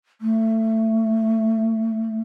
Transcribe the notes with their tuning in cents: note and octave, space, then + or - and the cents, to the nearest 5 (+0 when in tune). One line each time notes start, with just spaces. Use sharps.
A3 +20